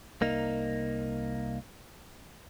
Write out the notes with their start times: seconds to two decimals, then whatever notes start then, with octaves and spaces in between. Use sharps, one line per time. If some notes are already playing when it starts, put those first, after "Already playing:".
0.21 C2 A#3 D#4